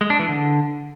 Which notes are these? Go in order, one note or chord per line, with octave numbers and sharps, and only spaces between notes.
G#3
D4
E3
D3